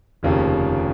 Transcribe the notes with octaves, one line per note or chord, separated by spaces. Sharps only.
F1 D#2 C#3 F3 A#3